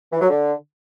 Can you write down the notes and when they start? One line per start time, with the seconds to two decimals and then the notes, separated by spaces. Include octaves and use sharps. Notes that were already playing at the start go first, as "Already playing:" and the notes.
0.13 E3
0.21 F#3
0.30 D3